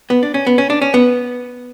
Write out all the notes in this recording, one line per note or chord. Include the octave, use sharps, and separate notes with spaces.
B3
D4
C#4
B3
C#4
D4
C#4
B3